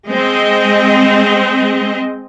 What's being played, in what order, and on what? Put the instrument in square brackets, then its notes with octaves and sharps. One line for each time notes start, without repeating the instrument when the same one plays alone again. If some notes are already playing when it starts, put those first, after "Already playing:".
[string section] G#3 C4 D#5